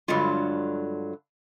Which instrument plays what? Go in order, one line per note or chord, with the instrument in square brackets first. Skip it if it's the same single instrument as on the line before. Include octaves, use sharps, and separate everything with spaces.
[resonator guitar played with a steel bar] G2 D3 F#3 G#3 F4